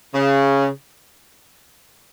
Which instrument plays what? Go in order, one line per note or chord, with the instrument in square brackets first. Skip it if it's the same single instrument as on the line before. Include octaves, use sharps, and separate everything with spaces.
[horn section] C#3